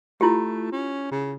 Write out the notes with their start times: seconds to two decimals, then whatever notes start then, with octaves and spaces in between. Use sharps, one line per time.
0.21 A3 E4 F4 G4
0.72 C#4
1.11 C#3